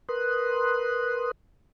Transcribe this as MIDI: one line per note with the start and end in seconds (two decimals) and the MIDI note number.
0.09 1.31 70
0.09 1.31 71
0.09 1.31 84
0.09 1.31 87
0.09 1.31 90